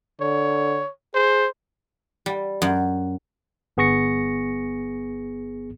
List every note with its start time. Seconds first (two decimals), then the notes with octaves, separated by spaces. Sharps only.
0.21 D3 C#5
1.15 G#4 C5
2.26 G3
2.62 F#2
3.77 G1 B3 G#4 C#6 A#6 C#7